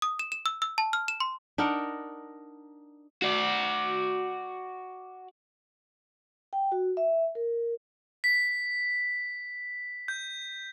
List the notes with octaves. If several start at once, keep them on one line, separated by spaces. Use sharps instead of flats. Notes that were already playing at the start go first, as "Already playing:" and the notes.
D#6
E7
E7
E6
E6
A5
F6
E7
C6
D4 D#4 A#4 F#5
F#4 D5
G5
F#4
E5
A#4
B6
G6